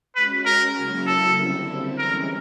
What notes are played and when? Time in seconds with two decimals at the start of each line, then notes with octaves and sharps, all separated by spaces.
0.16 G#3 C#4 F#4 B4
0.46 A#4
0.77 C#3 F#3 A#3 C#4 E4
1.07 A4
1.38 D3 G3 C4 E4
1.98 E3 G#3 C#4 A#4